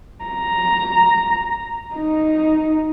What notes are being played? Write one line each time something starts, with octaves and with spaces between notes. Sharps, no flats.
A#5
D#4